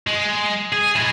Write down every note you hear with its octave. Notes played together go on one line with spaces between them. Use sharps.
G#3
G#4
G#3 E4